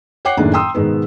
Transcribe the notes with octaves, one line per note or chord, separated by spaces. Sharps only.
C#5 F#5 G5 D6 F#6 C7
F#1 A2 D#3 A#3 D4 G#4
G5 A#5 C6 D#6 E6
G#2 B2 D#3 G#3 B3